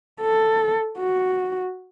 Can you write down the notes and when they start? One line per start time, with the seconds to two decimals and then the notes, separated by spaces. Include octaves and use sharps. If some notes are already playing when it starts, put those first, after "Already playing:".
0.22 A4
0.99 F#4